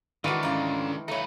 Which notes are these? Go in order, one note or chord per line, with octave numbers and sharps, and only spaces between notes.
D#3 E3 G#3 A3 D4 F4 F#4
G#2 C#4 F4
A3 D#4 B4 C#5 F5